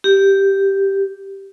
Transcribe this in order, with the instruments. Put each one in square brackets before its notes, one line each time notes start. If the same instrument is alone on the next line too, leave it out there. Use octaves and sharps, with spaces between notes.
[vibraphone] G4